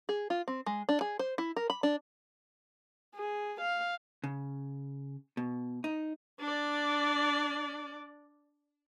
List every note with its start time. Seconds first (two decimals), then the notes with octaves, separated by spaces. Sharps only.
0.09 G#4
0.30 F4
0.48 C4
0.66 G#3
0.89 D4
1.01 G#4
1.19 C5
1.38 E4
1.57 A#4
1.70 B5
1.83 D4
3.15 G#4
3.61 F5
4.24 C#3
5.37 B2
5.84 D#4
6.40 D4 D5